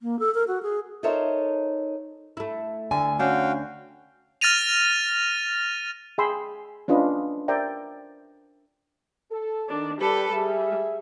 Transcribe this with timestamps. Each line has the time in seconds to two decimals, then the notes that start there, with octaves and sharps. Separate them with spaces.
0.02 A#3
0.19 A4
0.34 A#4
0.48 F#4
0.63 G#4
1.03 D#4 A4 A#4 C5 C#5 E5
2.37 A3 E4
2.91 D2 D3 G#5 E6
3.19 C#4 D4 F#4 F5 G5
4.41 F6 A6 A#6 D#7 F7
6.18 G#4 G5 G#5 B5 C6 E6
6.88 C#4 D4 F4 B4 D#5
7.48 A#4 C5 D5 E5 G5 A#5
9.31 A4
9.70 D#3 D4
10.00 G3 G4 A4 B4
10.33 G3 G#4 E5